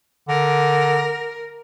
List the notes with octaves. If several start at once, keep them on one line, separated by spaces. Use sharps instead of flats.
D3 A#4